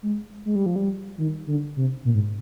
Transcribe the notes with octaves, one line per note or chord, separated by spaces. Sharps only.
G#3
G#3
G3
F3
G3
D#3
D3
C3
A#2
G#2